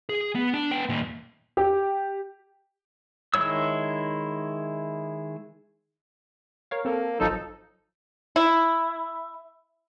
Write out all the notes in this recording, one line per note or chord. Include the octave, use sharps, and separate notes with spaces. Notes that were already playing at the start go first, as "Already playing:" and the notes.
G#4
B3
D4
B3 G5
D#2 A#2
G4
D#3 G#3 E4 C#5 E6
A#4 C#5 F5
A#3 C4 A4 A#4
G#1 F3 F#3 D#4 A4 C5
E4